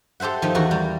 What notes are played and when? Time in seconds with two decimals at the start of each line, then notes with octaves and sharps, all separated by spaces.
0.20 G4 A4 C5 E5 F#5
0.42 D#3 F3
0.55 E2 F#4 A#4
0.71 G3